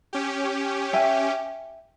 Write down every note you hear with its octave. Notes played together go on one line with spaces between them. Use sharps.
C#4 G4
E5 G5 G#5